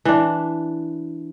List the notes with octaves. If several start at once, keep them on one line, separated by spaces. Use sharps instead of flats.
E3 D4